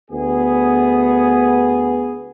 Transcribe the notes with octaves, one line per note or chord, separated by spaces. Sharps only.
D2 B3 G#4